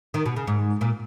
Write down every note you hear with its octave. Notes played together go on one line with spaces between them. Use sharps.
D#3
B2
C#3
G#2
A#2